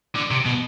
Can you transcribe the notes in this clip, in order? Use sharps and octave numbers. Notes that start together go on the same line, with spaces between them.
D3
C3
B2